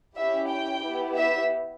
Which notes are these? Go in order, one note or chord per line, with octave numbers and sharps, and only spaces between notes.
C#4 E4 G4 E5
G5
B3 E4 G4
E5